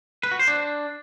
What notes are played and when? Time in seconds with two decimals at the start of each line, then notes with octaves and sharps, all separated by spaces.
0.23 B4
0.31 F#4
0.39 C5
0.47 D4